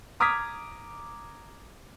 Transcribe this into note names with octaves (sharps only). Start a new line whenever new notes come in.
A#5 D6 D#6 F6 G#6 B6